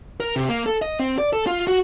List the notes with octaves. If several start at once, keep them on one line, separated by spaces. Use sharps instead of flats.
A#4
C3
A#3
A4
D#5
C4
D5
A4
F4
F#4